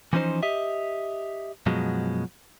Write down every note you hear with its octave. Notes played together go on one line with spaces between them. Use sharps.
E3 F3 C#4 D#4 C5
G4 D#5 E5
F#2 B2 F3 F#3 G#3